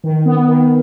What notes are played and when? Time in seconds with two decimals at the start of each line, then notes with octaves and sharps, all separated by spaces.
0.04 D#3
0.26 B3
0.48 D#3